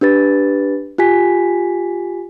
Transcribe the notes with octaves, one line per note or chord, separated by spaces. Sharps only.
D4 G4 B4 A6
F4 G4 G#5 B6